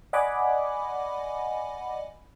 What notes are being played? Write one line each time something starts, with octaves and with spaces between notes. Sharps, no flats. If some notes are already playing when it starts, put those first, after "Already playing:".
D5 D#5 F#5 G#5 B5 D6